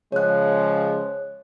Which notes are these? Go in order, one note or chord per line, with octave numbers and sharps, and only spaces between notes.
C#3 F3 G#3 C#5 F#6